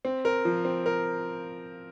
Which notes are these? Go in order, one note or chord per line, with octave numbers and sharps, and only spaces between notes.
C4
A#4
F3
C4
A#4